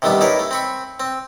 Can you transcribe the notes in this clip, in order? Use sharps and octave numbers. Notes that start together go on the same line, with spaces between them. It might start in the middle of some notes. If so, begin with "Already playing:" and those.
C3 D#3 G3 A3 B3 D4
C#4 D#4 E4 A#4 B4
A3
C4 B5 C#6
C4